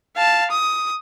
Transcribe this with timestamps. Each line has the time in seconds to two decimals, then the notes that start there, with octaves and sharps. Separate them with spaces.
0.16 F5 A5
0.51 D#6